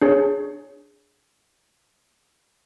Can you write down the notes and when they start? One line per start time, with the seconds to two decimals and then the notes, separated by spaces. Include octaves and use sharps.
0.02 D4 G#4 C#5